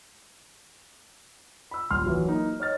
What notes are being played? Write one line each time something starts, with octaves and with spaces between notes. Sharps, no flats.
B5 E6
D#1 C6 F6
E3 F#3
A#3 D#4
C#5 D#5 F6 A6